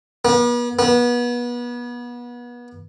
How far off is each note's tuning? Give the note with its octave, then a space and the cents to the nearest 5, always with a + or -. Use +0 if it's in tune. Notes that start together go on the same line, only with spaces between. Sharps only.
B3 -40
B3 -30